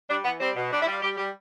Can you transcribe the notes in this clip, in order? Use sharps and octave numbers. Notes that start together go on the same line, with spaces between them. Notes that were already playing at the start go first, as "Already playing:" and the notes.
G3 D4
E3 B3
G3 C4
B2
G3 D4
E4
G3
F4
G3 G4
G3 G4